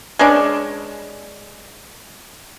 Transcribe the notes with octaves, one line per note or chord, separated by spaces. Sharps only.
G#3 C#4 D4